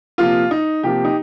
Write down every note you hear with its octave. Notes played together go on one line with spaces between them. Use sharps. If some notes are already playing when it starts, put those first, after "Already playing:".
C3 F3 A#3 F4
D#4
C3 F3 A#3 G4
D#4